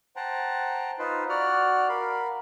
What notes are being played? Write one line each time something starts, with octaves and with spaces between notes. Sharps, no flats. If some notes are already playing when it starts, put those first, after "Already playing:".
C5 F#5 G5 A5 A#5
D#4 F4 B4 C5
F#4 D5 F#5 F6
A#4 F5 B5